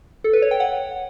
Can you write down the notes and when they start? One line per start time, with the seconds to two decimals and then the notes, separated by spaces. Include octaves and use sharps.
0.24 A4
0.33 B4
0.42 C#5
0.51 G5
0.60 F#5